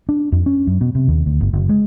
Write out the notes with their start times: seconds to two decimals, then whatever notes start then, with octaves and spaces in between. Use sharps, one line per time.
0.09 D4
0.32 F2
0.46 C#4
0.67 F#2
0.81 B2
0.95 C3
1.08 D#2
1.26 D2
1.41 G1
1.53 F#1
1.69 G#3